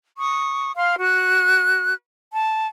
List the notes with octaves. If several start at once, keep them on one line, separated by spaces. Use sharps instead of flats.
C#6 D#6
F5 C6 F6
F#4 F#6
A5